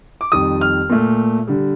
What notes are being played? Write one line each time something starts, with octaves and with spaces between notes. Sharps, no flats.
D6
F2 D#3 G3 D#6
F6
A#2 A3
D3 G3